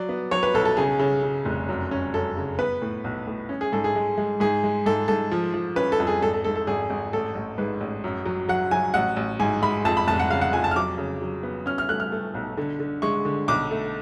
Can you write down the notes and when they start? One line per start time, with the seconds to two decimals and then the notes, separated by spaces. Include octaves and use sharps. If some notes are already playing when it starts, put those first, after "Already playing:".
Already playing: F#3 D5
0.09 B3
0.31 F#3 C#5
0.43 B4
0.54 B1 A4
0.65 A4
0.77 C#3 G#4
0.99 C#3
1.23 C#3
1.45 F1
1.69 F#2
1.91 C#4
2.14 F#2 A4
2.37 C#3
2.59 B3 B4
2.82 A2
3.04 B1
3.27 A2
3.49 C#4
3.61 G#4
3.72 G#2 A4
3.84 G#4
3.96 G#3
4.18 G#3
4.40 G#2 G#4
4.64 G#3
4.86 G#2 A4
5.08 G#2 A4
5.32 F3
5.54 F3
5.76 C#4 B4
5.92 A4
6.00 F2
6.07 G#4
6.22 G#1 A4
6.33 A4
6.44 G#2 A4
6.56 A4
6.67 G#1 G#4
6.90 G#1
7.13 A1 A4
7.35 A1
7.58 G#2 B4
7.81 A1
8.04 F#2
8.25 F#3
8.49 F#3 F#5
8.71 F#3 G#5
8.94 A1 F#5
9.16 A1
9.40 G#2 G#5
9.62 G#3 B5
9.85 F2 A5
9.97 B5
10.07 F1 A5
10.20 F#5
10.31 C#3 F5
10.41 F#5
10.53 F2 G#5
10.64 A5
10.71 F6
10.76 F#3 D6
10.98 C#3
11.22 F#3
11.43 B3
11.66 C#4 F6
11.78 F6
11.89 A3 F#6
12.00 F6
12.12 A3
12.34 B1
12.57 D3
12.80 D3
13.02 G#3 C#6
13.25 D3
13.48 B1 D6
13.71 A3